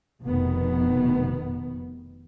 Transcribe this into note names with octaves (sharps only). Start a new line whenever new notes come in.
F1 B2 D#3 B3